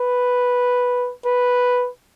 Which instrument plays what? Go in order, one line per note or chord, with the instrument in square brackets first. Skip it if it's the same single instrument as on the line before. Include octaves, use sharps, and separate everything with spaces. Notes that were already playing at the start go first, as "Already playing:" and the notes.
Already playing: [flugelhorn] B4
B4